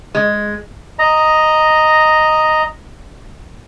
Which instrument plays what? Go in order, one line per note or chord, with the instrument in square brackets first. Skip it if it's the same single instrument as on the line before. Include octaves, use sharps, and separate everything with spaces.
[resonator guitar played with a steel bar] G#3
[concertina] D#5 A#5